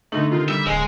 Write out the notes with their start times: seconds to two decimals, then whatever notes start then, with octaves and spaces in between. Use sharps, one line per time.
0.12 D3 A3 D#4 F#7
0.31 C3 D#3 F4
0.49 G3 E5
0.67 D1 G#3 C5 D#5